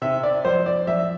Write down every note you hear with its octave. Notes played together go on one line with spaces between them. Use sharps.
C3 E5
D5
F2 C5
D5
F2 E5